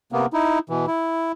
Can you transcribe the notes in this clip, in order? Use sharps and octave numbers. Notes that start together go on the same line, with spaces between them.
C3 A#3 B3
D#4 E4
B2 E3
E4